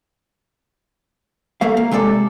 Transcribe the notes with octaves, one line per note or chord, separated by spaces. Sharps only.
A3 A#3 F5
A#3
C3 G#3 A4 D5